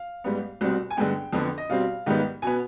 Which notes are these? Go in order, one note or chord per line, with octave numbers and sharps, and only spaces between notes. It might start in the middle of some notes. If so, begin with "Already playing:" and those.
Already playing: F5
G#2 G3 B3
C2 B2 G3 C4
G#5
G2 D3 G#3 B3 G5
F2 D3 F3 B3
D#5
B2 G3 C4 F5
G#2 D#3 G3 B3
B2 B3 G#5